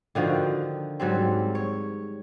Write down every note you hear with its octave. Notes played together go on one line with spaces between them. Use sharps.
D3 D#3 F3 F#4
G#2 F#3 G3 C4
C#5